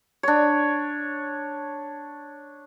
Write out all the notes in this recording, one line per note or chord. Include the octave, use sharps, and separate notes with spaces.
D4 C#5